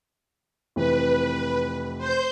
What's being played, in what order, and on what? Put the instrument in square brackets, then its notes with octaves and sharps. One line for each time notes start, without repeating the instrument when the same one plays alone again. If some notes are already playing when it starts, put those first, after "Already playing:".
[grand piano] F1 E3 C4 [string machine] B4
[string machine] C5 G6